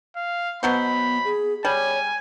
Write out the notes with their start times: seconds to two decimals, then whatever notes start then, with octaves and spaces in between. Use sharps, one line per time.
0.16 F5
0.63 B2 F#3 B3 C5 B5
1.25 G#4
1.65 G3 C#5 G#5